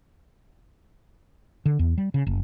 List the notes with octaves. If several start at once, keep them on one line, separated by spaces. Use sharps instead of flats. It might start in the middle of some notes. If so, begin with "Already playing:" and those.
D3
E2
G3
C#3
F#1